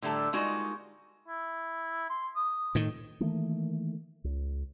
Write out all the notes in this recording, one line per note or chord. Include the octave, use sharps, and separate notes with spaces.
A2 D3 G3 A3 A5 A#5
G3 G#3 A#3 D#4 F4 F#4
E4
C6
D#6
A2 D#3
D#3 E3 A3 A#3
C#2